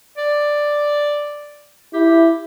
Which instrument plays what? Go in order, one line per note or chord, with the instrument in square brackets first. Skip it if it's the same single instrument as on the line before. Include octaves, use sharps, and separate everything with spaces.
[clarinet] D5
[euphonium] E4 [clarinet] G4